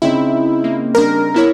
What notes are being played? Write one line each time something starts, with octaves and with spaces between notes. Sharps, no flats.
C#3 C4 D#4 E4
A#3
G3 D4 A#4
B3 E4 C#5